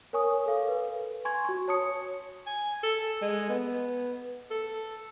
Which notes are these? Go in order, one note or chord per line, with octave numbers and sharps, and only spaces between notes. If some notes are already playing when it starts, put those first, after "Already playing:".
A#4 C#5 G#5 C#6 D#6
A4 F5
B4
G#5 C6 C#6 G#6
F#4 C#6
C#5 A5 D#6 C#7
G#5
A4
G#3
B3
A4